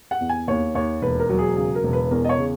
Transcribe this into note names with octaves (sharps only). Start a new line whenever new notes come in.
F#5
E2
G#5
D#2 C#5
D#2 C#5
E1 B4
A#4
F#3
G#4
C#3 G#4
A#4
E1
B4
E2 A#4
D#5
C#5
C#3